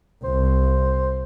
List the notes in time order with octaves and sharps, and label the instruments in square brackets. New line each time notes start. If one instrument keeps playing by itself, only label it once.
[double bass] C2 [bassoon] C5